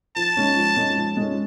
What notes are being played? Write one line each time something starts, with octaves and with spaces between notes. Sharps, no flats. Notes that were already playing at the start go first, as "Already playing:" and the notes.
F3 A5
G#3 C#4
F3
G#3 C#4
F3
G#3 C#4